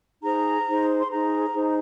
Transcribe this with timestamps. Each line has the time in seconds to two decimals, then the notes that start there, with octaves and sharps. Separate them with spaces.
0.22 D#4 G#4 C5 A#5
0.67 D#4 G#4 C5
0.99 C6
1.10 D#4 G#4 C5 A#5
1.54 D#4 G#4 C5